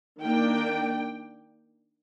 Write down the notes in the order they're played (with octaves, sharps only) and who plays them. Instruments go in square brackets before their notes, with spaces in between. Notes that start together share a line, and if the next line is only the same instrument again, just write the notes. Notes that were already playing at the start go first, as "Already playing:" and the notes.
[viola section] D#3 A#3 D4 G5